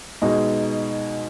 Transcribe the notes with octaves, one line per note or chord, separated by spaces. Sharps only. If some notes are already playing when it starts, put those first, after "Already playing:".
B2 G#3 D#4 G#4